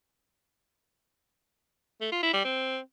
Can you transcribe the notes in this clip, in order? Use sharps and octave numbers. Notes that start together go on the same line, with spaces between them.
A3
F4
E4
G3
C4